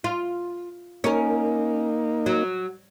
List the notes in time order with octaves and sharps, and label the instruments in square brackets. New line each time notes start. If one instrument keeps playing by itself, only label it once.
[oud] F4
[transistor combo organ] A#3 D#4 [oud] C#4 A#4
[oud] F#3